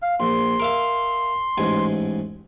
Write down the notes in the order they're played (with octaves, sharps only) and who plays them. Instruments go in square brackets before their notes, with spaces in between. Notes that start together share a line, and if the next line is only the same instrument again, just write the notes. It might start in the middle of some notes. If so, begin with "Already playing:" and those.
[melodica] F5
[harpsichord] A#1 [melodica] C6
[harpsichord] A#4 E5 F5
A1 G#2 G#5